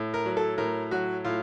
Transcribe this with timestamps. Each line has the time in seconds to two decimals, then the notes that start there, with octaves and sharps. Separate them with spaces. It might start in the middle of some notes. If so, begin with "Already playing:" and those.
Already playing: A2
0.14 A#4
0.26 F#3
0.37 A4
0.58 A2 A#4
0.91 F#3 F#4
1.24 A2 F4